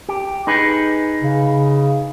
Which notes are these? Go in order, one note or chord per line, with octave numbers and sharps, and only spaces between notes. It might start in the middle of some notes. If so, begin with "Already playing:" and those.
G4
D#4 G#4 B4
C#3